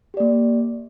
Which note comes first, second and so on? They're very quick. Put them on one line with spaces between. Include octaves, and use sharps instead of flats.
G4 D5 A#3